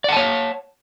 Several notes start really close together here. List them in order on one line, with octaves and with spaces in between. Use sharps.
D5 F#5 A5 C#5